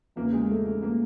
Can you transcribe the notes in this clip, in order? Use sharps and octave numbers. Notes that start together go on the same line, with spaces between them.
E2 C#3 E3 A#3
G#3
A3
A3
A#3